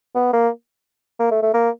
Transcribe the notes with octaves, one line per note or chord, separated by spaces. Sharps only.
B3
A#3
A#3
A3
A3
A#3